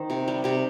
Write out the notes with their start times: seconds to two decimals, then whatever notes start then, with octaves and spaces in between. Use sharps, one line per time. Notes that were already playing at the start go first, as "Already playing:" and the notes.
Already playing: D#3 C5
0.10 C3
0.28 G3
0.44 C3 G4